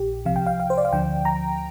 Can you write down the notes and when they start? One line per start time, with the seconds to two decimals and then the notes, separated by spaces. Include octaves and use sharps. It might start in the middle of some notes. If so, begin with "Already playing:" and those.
Already playing: A#1 A#2 G4
0.25 C2 C3 F3 F5
0.36 G5
0.46 F5
0.60 F5
0.70 C5
0.78 D5
0.85 F5
0.92 D2 D3 F3 G5
1.25 A#5